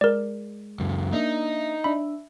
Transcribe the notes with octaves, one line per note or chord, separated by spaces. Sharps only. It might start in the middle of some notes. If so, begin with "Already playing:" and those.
G#3 A#4 D5
C#2 F#2
A#3 D4 D#4 E5
D4 E5 B5